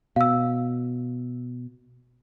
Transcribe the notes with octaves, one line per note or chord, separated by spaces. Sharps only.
B2 F5 E6